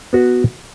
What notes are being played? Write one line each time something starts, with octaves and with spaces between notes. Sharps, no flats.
B3 F#4 B4